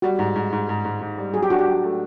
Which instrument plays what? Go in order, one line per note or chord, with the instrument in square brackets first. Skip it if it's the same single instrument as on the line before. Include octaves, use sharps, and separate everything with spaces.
[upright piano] G3 [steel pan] F#4
[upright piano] G#2
G#2
G#2
G#2
G#2
G#2
G3
[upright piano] F#3 [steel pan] G#4
[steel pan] G4
[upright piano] D4 [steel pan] F#4
[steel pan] G4
[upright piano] F#3
A3